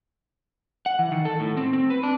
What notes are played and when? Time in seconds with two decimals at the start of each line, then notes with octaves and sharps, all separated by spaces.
0.86 F#5
0.99 E3
1.12 D#3
1.25 A4
1.40 A2
1.57 C4
1.73 C4
1.90 B4
2.03 D4